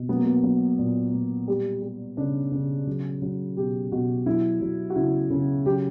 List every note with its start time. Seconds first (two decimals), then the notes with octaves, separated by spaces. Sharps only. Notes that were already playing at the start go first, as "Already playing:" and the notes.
Already playing: B2
0.09 F#3 B3
0.17 A#3
0.25 B3
0.43 F#3
0.79 A#2
1.14 A#2
1.48 G3
1.82 G3
2.17 C#3 D4
2.52 C#3
2.87 F#3
3.22 F#3
3.57 B2 G4
3.92 B2 F#4
4.26 F#3 E4
4.61 F#3
4.90 F#4
4.96 C#3 E4
5.30 C#3
5.66 F#3 G4